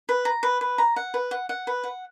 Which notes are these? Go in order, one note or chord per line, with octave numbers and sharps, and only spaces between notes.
B4
A#5
B4
B4
A#5
F#5
B4
F#5
F#5
B4
F#5